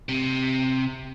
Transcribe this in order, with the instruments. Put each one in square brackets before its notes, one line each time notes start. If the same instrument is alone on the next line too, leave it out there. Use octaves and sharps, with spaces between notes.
[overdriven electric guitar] C3